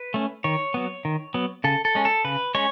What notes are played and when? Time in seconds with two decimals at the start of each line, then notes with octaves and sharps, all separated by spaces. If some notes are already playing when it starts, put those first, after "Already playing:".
Already playing: B4
0.14 A3 C#4
0.44 D#3 C#5
0.74 F#3 B3
1.05 D#3
1.34 F#3 B3
1.64 C#3 A4
1.85 A4
1.95 G#3 C#4
2.05 A4
2.24 C#3 B4
2.55 G#3 C#4 C#5